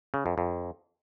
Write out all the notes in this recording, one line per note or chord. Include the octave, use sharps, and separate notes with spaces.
C#3
F2
F2